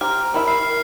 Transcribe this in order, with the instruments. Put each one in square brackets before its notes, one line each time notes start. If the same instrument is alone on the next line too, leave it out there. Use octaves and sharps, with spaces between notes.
[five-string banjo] G4 C5 [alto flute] A#5 [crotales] F6
[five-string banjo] D#3 E4 E5 [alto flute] B5
[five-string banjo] E5 [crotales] C7
[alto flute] A#4